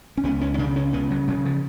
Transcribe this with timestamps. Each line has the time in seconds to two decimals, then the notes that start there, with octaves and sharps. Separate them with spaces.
0.17 C#4
0.24 C#2 B3
0.41 C#4
0.54 C#4
0.58 C#3 D4
0.76 C#4
0.93 C#3 B3
1.10 F#3
1.28 C#3 F#3
1.45 F3